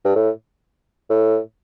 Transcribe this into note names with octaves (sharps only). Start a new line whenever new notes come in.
G2
A2
A2